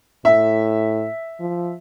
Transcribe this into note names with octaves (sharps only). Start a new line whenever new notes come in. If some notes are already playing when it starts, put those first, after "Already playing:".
A2 E5
F3